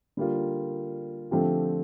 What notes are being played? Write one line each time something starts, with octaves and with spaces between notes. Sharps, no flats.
D3 G3 A#3 F4
D3 F3 A3 C4 G4